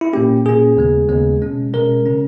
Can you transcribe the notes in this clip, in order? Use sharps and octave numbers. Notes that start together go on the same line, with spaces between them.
E4
A#2 A#3 C#4 G4
A#2 A#3 C#4 G#4
D#2 C#3 G#3 B3
D#2 C#3 G#3 B3
B2 G#3 C#4
B2 G#3 C#4 A#4
C#3 G#3 C#4